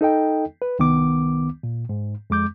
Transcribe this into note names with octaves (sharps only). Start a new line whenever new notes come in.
D#4 A4 D#5 G5
B4
C2 D#3 B3 D6
A#2
G#2
F2 G#3 D6 G6